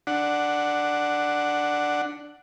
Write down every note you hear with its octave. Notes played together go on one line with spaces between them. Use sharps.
D4 F#5